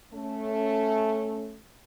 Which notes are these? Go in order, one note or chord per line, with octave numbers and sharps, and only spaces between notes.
A3 C#4